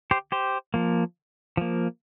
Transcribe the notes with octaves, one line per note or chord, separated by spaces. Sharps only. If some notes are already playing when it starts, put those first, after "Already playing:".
G4 C5
G4 C5
F3 A#3
F3 A#3